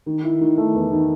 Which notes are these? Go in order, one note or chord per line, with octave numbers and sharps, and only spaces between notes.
D#3
E4
D#3
A3
E2
D#3